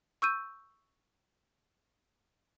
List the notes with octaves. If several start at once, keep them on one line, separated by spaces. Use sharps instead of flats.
C#6 E6 G6 D#7